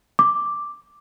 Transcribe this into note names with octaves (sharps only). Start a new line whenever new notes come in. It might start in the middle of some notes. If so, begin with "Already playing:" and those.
D6